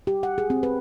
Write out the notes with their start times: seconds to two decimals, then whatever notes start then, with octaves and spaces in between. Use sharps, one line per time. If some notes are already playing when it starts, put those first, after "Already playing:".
0.07 G4
0.23 F#5
0.38 G#4
0.50 C4
0.63 B4